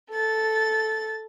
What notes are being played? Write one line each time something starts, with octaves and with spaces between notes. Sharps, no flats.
A4 A6